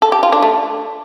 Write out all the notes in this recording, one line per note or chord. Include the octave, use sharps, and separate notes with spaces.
A4
G4
F4
D4
A3